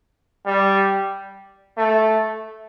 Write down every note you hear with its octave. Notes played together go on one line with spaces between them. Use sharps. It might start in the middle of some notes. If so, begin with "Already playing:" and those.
G3
A3